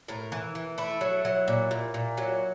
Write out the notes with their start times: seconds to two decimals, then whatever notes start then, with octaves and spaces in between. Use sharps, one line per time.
0.08 A2 A#4
0.32 E3
0.55 E3
0.78 A3 E4
1.01 F#3
1.25 F#3
1.48 A#2
1.71 A#2
1.94 A#2
2.18 F#3